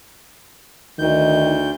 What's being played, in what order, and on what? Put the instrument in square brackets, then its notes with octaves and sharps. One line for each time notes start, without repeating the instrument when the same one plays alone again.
[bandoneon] D2 G6 [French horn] D#3